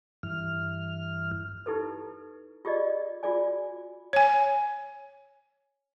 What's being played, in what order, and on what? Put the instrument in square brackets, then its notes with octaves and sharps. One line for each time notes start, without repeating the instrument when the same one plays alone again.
[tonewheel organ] G2 E3 F6
[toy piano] D#4 E4 G4 A4 B4
F4 G4 G#4 D5 D#5
F4 F#4 G#4 D5 G#5
[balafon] C#5 G#5